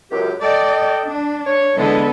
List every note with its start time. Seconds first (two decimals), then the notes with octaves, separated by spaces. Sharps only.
0.11 C#2 F#2 G4
0.42 A4 D5 D#5 G5
1.07 D4
1.46 C#5
1.77 D3 E3 G#3 B3 A4